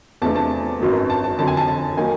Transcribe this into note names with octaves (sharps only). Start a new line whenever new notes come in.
E2 C3 F3 A3 D4 A5
A5
G#1 F#2 D#3 F#3 B3
A5
A5
F2 D3 F#3 A5
G#5
A5
A5
D#3 F#3 A#3 D#4 G#5